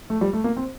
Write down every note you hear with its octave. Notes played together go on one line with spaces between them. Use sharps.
A3
G3
A3
A#3
C4